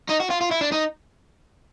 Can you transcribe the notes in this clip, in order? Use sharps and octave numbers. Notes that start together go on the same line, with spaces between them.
D#4
F#4
F4
F4
E4
D4
D#4